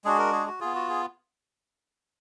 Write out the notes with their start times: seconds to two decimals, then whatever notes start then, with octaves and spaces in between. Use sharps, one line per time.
0.05 G#3 D4 F#4 G#4
0.19 A#4
0.33 G#4
0.47 F#4
0.60 B3 F4 G#4
0.75 F#4
0.89 G#4